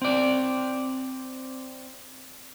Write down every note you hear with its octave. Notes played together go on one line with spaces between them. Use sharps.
C4 D5